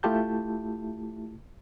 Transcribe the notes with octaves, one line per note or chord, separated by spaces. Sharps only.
A3 E4 F4 G4 A5 G6